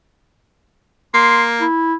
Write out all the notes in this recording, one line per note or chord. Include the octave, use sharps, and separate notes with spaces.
A#3 C6
E4